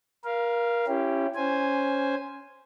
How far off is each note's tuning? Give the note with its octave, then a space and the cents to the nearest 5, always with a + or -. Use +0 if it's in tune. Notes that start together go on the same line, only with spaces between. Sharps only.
A#4 +25 F5 -10
C#4 -10 E4 +25 G4 +0
C#4 +10 C5 +0 G#5 -5